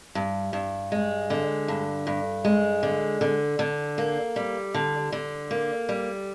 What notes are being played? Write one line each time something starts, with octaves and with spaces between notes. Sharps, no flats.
G2
G2
G#3
D3
G2
G2
G#3
D3
D3
D3
A#3
G3
D3
D3
A#3
G3